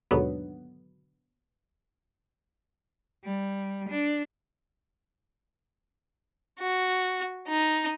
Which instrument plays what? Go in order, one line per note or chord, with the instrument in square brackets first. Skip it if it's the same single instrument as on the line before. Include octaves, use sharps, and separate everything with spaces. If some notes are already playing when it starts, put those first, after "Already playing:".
[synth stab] D#2 G#2 B2 D3 F#3 B3
[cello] G3
D4
[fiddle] F#4
D#4